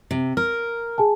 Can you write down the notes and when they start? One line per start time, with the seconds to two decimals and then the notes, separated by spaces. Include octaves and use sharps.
0.11 C3
0.37 A#4 F6
0.98 G#4 G#5 A5